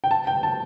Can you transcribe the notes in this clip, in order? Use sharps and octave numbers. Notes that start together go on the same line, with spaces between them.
G5
A5
G5
A5